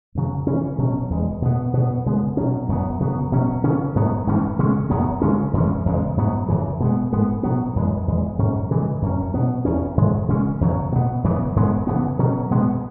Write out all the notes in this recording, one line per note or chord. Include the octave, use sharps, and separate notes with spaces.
F#2 C#3 F#3
C#3 E3 C#4
B2 F#3 C#4
E2 E3 G#3
B2 B3
B2 B3
C#3 G#3 B3
B2 F#3 C#4
F#2 F#3 B3
C#3 F#3 B3
B2 F#3 C#4
C#3 E3 C#4
G#2 F#3 B3
G#2 E3 C#4
C#3 G#3 C#4
F#2 F#3 B3
C#3 G#3 C#4
F#2 E3 G#3 C#4
E2 C#3 G#3
G#2 F#3 B3
F#2 C#3 E3
B2 G#3 B3
G#2 G#3 B3
B2 F#3 B3
F#2 E3 G#3
E2 E3 G#3
G#2 F#3 C#4
C#3 E3 G#3
F#2 F#3 C#4
B2 B3
E2 E3 C#4
G#2 E3 G#3
C#3 G#3 C#4
E2 C#3 F#3
B2 B3
F#2 C#3 E3 B3
G#2 G#3 B3
C#3 E3 B3
B2 F#3 C#4
B2 G#3 B3